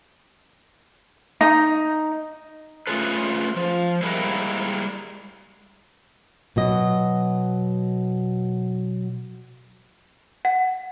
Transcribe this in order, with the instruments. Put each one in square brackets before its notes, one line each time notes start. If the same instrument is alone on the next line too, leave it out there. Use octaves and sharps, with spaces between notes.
[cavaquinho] D#4
[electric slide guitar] A3 C#4 F4 G#4 A4 B4
F3
G3 G#3 A#3 E4 A#4
[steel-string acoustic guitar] B2 F#3 D#5
[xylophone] F#5